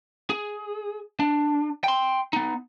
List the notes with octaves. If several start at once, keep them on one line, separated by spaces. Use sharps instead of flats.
G#4
D4
G5 C6
B3 D#4